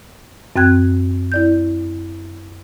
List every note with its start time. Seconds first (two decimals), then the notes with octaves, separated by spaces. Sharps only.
0.56 F#2 C4 G5 F#6 G#6
1.32 E4 D5 G6